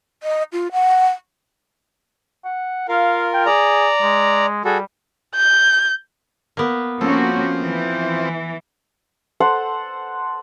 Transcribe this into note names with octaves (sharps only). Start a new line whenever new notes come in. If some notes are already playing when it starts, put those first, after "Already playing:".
D#5
F4
F#5
F#5
F4 A#4 F5
G5
G#4 D5 A#5
G#3
G3 F#4 G#4 A4
G6
A#3 B3
F3 A#3 C4 C#4 F#4 A4
E3
A4 C5 F#5